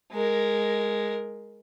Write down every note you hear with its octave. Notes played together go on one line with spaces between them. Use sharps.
G#3 A#4